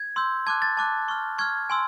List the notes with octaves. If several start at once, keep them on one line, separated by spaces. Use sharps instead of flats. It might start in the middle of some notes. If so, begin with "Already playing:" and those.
Already playing: G#6
C6 E6 G6
A5 D6 F#6 G#6
A6
A5 D6 F#6
C#6 F6
C#6 F6 G#6
G#5 C6 E6